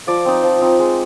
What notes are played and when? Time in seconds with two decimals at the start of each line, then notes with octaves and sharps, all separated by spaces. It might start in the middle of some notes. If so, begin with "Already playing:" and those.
0.07 F3 D5
0.25 C4 D#4
0.43 F3
0.61 C4 D#4
0.79 G#3